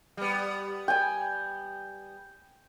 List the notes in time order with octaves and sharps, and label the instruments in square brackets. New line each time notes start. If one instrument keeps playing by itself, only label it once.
[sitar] G3 B3
[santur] G5 G#5